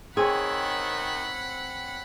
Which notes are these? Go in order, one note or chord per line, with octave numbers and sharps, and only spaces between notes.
D#3 C4 G#4 C#5 F#5 B5